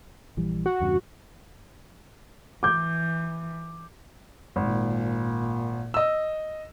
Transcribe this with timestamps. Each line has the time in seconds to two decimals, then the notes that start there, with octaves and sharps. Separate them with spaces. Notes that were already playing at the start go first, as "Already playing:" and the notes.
0.37 A#1 E3 G3
0.66 F#4
0.80 E2 G2 C#3
2.63 E3 D6 G6
4.56 G#1 A#2
5.94 D#5 E6